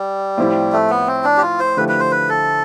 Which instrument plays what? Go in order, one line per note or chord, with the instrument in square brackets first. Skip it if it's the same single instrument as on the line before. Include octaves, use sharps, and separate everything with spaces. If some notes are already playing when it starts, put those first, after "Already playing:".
Already playing: [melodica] G3
[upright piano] A2 F3 C4 E4 G4
[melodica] A3
B3
C4
D4
G4
F4
C5
[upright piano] D3 F3 A3 E4 G4 [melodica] B4
[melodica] B4
C5
B4
A4